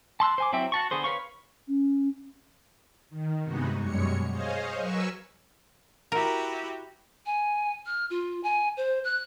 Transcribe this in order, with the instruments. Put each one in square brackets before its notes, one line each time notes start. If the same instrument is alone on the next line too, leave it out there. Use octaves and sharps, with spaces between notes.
[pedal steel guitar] A5 C6 E6 F#6
C5 G#5 D6
F#3 C4 E4 E5 G5
F#4 A5 C#6
D3 B3 G#4 C5
B4 C#5 F5 C#6
[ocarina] C#4
[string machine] D#3
G2 C3 G#3 B3 D#4 F#4
F#2 B2 G3 G#3 C#5 C#7
G#4 C5 C#5 D#5 F5
F#3 A#4 B4 G#5 C#6 E6
[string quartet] E4 F#4 G4 [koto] A#4
[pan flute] G#5
F6
F4
G#5
C5
F#6